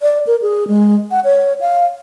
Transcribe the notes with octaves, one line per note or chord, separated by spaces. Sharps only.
D5
A#4
G#4
G#3
F#5
C#5
F5